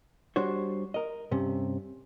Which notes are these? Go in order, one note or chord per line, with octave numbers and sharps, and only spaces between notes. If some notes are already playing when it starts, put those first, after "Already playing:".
G3 D4 F#4 C5 C#5
A#4 D#5
G2 C3 C#4